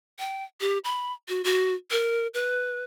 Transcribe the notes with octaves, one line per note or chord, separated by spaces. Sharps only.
G5
G4
B5
F#4
F#4
A#4
B4